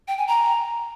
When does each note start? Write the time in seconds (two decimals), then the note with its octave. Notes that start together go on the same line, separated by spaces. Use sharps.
0.08 G5
0.18 G#5
0.28 A#5